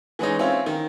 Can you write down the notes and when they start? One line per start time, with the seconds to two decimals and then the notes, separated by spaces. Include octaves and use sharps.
0.19 E3 G#3 C#4 D#4
0.39 C4 C#4 E4 F4
0.66 D#3